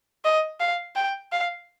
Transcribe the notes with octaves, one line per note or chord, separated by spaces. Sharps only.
D#5
F5
G5
F5